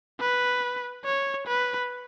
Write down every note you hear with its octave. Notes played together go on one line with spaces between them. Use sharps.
B4
C#5
B4